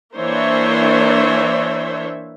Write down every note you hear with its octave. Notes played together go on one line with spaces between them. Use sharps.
E3 A#3 D4 C5 C#5 E5